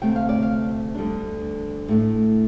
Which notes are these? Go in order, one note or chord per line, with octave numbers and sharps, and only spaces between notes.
D2 C3 A3 C4 G5
F5
D5
F5
D2 D3 G3 D4
A2 A3 D4